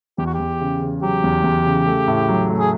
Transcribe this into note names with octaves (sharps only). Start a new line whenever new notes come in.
E2 G4
F#4
G4
E2
C#3
C#3
F#3 G4
E2
E2
C#3
A3
A2
F#3
A3
G#4